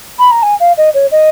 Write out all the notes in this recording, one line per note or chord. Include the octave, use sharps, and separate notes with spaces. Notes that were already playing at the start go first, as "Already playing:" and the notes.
B5
A#5
G#5
F5
D#5
C#5
D#5